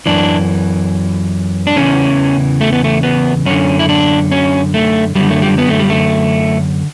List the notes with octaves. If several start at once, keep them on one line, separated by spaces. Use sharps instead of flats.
F#2 E3 D4
D4
E2 C#3 E3 C#4
A3
B3
A3
B3
F#2 D3 C#4
E4
D4
C#4
A3
F#2 D3 G3
A3
G3
B3
A3
G3
A3